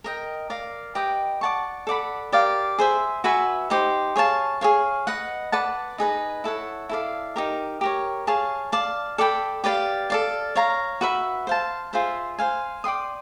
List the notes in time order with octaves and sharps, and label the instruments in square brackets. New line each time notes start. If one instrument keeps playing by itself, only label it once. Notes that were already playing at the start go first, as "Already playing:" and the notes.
[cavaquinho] A#4 D#5 G5
A#4 D5 F5
G4 B4 D#5 G5
D5 F#5 A5 C#6
A4 D5 F#5 B5
G4 A#4 D5 F5
G#4 C5 E5
F#4 B4 E5 G#5
D#4 G4 C5
G#4 C#5 F5 A5
G#4 C#5 F5
B4 D#5 F#5
B4 D5 F#5 A5
D#4 G#4 B4 D#5
E4 A4 C#5 F#5
E4 A4 D5 F5
D#4 G4 A#4
G4 A#4 C#5
G#4 C#5 F5 A5
D5 F5 A5
A4 D5 G5 B5
G4 B4 D5 F5
A4 D5 F5
C#5 F5 A#5
F#4 B4 E5
C5 F5 A5
F4 G#4 C5 E5
C5 F5 G#5
D5 G5 C6 D#6